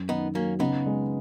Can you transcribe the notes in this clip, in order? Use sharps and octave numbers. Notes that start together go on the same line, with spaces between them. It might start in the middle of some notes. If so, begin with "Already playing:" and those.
Already playing: F#2
D#3 B3 D#4
F#3 A#3 C#4
C#3 B3 D#4
G#3